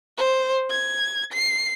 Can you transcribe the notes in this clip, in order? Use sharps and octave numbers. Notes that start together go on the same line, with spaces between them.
C5
G#6
C7